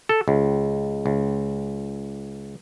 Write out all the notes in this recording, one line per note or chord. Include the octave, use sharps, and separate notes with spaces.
A4
C#2
C#2